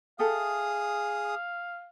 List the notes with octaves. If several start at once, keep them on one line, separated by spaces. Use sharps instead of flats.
G#4 A4 E5 F5 G5 D#6